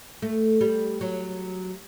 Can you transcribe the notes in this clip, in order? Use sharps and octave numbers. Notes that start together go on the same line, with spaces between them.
A3
G3
F#3